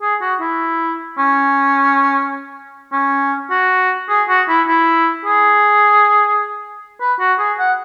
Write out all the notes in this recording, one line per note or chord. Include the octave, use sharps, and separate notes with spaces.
G#4
F#4
E4
C#4
C#4
F#4
G#4
F#4
E4
E4
G#4
B4
F#4
G#4
F#5